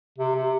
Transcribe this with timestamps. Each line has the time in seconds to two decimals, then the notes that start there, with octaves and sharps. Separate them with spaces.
0.18 C3
0.35 C3